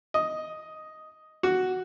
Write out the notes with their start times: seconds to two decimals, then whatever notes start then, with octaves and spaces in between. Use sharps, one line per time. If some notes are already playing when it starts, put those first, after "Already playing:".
0.14 D#5
1.43 F#4